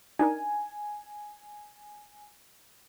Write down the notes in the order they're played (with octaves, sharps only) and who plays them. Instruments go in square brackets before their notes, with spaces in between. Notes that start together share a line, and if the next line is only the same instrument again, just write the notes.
[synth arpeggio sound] D4 D#4 A#4 [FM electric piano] G#5